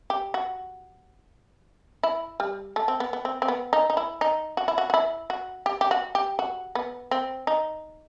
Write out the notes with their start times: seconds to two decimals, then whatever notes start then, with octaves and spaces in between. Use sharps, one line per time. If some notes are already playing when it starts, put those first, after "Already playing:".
0.10 G4
0.34 F#4
2.03 E4
2.40 G3
2.76 A3
2.88 C4
3.00 B3
3.13 B3
3.25 C4
3.42 C4
3.48 B3
3.73 D#4
3.90 D#4
3.97 E4
4.21 D#4
4.57 F#4
4.68 E4
4.78 F#4
4.90 F#4
4.94 E4
5.30 F#4
5.66 G4
5.81 G4
5.91 F#4
6.15 G4
6.39 F#4
6.75 B3
7.11 C4
7.47 D#4